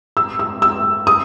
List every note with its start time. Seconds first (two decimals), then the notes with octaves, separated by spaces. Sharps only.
0.17 E6
0.39 E6
0.62 E6
1.07 D#6